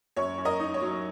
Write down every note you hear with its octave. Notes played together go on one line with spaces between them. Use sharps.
F#2 C#5
F#2
A#4 D#5
D#4
C#5
F#3